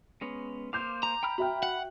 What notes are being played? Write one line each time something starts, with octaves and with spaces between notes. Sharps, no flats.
G#3 B3 C#4
A#3 C5 F5 D6 G6
A#5
G5 B5 F6
F#4 E5 G5 B5 F6
F#5